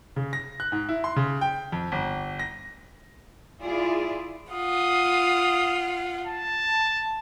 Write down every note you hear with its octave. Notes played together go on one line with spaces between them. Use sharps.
C#3
A#6
F#6
G#2
E4
C6
C#3
G5
F2
G1
A#6
E4 F4 G#4 D5
F4 F#5 D#6
A5